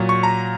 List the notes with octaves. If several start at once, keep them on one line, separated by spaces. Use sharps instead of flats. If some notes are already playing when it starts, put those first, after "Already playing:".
Already playing: A#2 F#3
C#6
A#5